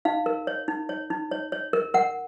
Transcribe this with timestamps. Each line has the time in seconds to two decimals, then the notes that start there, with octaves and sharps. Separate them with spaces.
0.05 D#4 F5
0.26 A#4
0.47 C#5
0.68 D#4
0.89 C#5
1.10 D#4
1.31 C#5
1.52 C#5
1.73 A#4
1.94 A#4 F#5